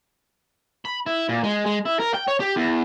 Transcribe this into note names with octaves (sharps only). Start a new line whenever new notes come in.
B5
E4
A#2
G#3
G#3
E4
A#4
G5
C#5
G4
E2